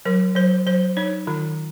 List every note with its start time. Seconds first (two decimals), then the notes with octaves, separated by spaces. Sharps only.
0.05 F#3 A#4
0.35 F#3 C5
0.67 F#3 C5
0.97 D#4 C#5
1.27 D#3 F4